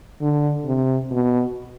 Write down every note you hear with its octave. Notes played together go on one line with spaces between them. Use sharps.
D3
C3
B2